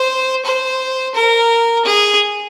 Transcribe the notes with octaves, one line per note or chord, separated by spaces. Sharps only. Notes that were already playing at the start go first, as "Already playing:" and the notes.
Already playing: C5
C5
A#4
G#4